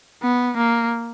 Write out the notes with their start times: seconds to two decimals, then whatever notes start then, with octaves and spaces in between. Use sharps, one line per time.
0.23 B3
0.57 A#3